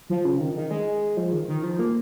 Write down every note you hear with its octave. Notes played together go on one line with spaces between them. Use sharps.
F3
C#3
D#3
D#3
G#3
F3
D#3
D#3
F3
A#3